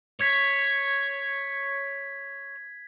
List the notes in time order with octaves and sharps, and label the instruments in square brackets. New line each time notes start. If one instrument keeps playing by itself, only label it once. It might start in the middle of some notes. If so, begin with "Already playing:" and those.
[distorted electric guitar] C#5 [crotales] G#6 B6